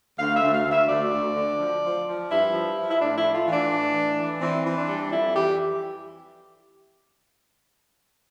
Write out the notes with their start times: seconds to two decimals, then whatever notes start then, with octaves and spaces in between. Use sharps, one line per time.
0.19 D2 F5
0.36 E5
0.42 D2
0.54 F5
0.65 D2
0.71 E5
0.89 D2 D5
1.12 D2
1.36 D3
1.59 F3
1.83 F3
2.06 F3
2.30 G2 E4
2.54 F3
2.77 F3
2.91 E4
3.00 A2 D4
3.18 E4
3.24 A3
3.35 F4
3.47 E3
3.53 D4
3.70 A2
3.94 E3
4.18 E3
4.41 E3 C4
4.65 E3
4.77 D4
4.88 G3
5.11 F2 E4
5.35 E3 G4